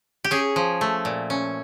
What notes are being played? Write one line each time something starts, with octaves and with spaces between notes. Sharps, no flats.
G4
C#4 G#4
F3
A3
A#2
C#4